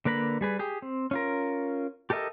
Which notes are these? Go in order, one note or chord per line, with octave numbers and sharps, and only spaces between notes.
D3 A#3 B4 A#5 B5
G3 G#4 B4
G4 G#4
C4
C#4 F4 A#4
G4 A4 A#4 D#5 E5